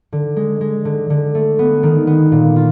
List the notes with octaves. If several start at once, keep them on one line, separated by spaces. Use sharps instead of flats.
D3
G#3
G#3
D3
D3
A3
B3
D#3
B3
A#2
F4